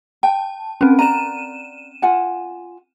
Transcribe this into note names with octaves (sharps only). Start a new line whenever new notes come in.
G5 A5
C4 C#4 B4
D5 A#5 D#7 E7
F4 F#5 G#5